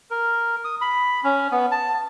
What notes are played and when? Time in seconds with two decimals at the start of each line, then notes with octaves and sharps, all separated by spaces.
0.11 A#4
0.64 D#6
0.81 B5
1.24 C#4
1.52 B3
1.72 A5